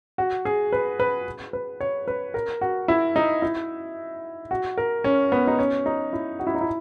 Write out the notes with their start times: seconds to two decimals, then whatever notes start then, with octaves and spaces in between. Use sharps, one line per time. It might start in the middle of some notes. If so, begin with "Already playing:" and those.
0.18 F#4
0.45 G#4
0.73 B4
1.00 B4
1.53 B4
1.81 C#5
2.08 B4
2.34 A#4
2.61 F#4
2.88 E4
3.16 D#4
3.42 E4
4.51 F#4
4.78 A#4
5.04 C#4
5.32 B3
5.47 D#4
5.59 C#4
5.86 D#4
6.13 E4
6.39 F#4
6.47 E4
6.55 D#4
6.61 E4